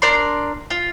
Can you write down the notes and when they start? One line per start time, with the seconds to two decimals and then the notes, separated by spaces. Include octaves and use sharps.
0.02 D4 A#4 D5 C6
0.70 F4